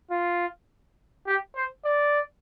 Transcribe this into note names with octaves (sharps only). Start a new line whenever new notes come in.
F4
G4
C5
D5